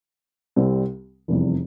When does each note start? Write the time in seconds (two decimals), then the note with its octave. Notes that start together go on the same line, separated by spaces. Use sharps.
0.56 C2 C3 G3 C4
1.28 F1 E2 C3 G3